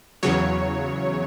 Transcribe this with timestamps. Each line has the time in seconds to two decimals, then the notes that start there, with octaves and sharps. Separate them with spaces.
0.23 E2 C#3 F#3 C#5